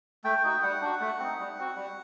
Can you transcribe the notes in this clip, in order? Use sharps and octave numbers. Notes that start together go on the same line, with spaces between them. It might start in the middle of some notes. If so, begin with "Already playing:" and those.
A3 G5
D#4 F#4
G3 F#5
D4 F#4
A3
C4 D#4
G3
C4 F#4
G3